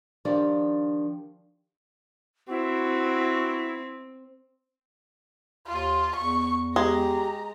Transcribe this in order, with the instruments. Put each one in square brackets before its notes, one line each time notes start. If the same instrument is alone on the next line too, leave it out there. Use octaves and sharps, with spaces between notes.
[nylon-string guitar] D#3 F3 D4 G4 D5
[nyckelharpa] C4 [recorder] E4 [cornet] F#4
[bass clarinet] D#2 [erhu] F4
[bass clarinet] E2 [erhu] C#6
[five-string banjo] G#3 [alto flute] G4 [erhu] A#5